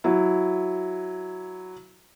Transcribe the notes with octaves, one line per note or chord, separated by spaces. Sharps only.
F#3 E4